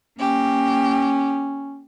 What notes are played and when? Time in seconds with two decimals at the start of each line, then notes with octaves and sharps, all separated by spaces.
0.19 A#3 C#4 G4